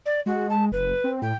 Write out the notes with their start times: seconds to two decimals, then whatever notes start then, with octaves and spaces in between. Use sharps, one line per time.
0.06 D5
0.26 G#3 F#4
0.50 A5
0.72 F#1 B4
1.04 C4
1.22 A2 G5